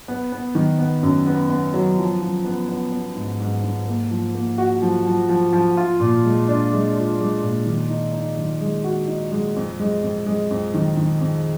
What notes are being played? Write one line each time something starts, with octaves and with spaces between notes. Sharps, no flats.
B3
B3
D#3
B3
F#2
B3
B3
F#3
F3
F3
B3
B3
B3
G#2
G#2
G#2
A#3
F3
A#3
F#4
F3
F3
F3
F3
F4
A#2
G#3
D4
G#3
F4
G#3
A#2
D#3
D#4
D#4
D#3
G#3
F#4
D#4
G#3
F2
G#3
F2
G#3
F2
D#3
D#3
F2